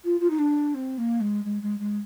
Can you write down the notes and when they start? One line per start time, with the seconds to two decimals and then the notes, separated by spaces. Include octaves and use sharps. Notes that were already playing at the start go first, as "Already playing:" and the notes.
0.04 F4
0.20 F4
0.30 D#4
0.39 D4
0.74 C4
0.98 A#3
1.20 G#3
1.44 G#3
1.62 G#3
1.79 G#3